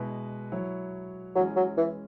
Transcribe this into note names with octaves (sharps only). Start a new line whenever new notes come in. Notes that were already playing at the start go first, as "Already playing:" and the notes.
Already playing: B2 G#3 E4 B4
F#3 E4 C#5
E3 F#3 G#3 C#4
F#3
E3